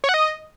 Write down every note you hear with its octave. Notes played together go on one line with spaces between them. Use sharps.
C#5
F#5
D#5